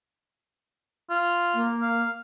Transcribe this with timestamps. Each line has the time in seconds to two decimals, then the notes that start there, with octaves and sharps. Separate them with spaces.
1.10 F4
1.55 A#3
1.82 F5